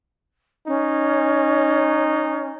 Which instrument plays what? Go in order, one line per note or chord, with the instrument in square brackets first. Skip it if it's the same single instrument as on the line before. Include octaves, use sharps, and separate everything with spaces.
[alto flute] C#4 [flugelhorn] D#4